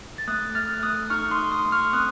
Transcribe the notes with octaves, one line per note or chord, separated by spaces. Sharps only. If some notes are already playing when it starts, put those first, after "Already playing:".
A6
A3 D#6 F#6
A3 F6 A6
A3 D#6 F#6
D#4 C#6 F6
C6 D#6
A3
C6 D#6
A3
C#6 F6
C4 D#6 F#6